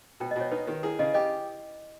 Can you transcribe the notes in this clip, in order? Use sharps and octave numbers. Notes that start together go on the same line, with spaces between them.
B2 G5
B2 D#5
C#5
D#4 B4
D#3 G4
E4 G#4
C#3 D#5
G4 D#5